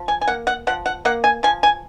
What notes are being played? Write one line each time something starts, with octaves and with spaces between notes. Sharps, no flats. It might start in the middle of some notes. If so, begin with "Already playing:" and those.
Already playing: F3
G#5
G#5
A#3 F#5
F#5
F3 F#5
F#5
A#3 F#5
G#5
F3 G#5
G#5